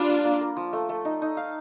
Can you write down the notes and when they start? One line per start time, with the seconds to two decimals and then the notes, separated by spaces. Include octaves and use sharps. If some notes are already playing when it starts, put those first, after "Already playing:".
Already playing: G3 D4 F4 F5
0.09 A#3
0.24 A#3
0.41 A#4
0.57 F3
0.73 A3
0.89 A3
1.05 D#4
1.22 D#4
1.37 F5